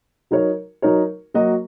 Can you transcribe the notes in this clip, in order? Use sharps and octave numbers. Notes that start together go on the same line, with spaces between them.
F#3 D#4 A#4 C#5
F#3 D#4 A#4 C#5
F#3 A#3 F#4 D#5